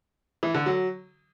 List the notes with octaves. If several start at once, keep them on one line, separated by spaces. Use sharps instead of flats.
E3
D3
F#3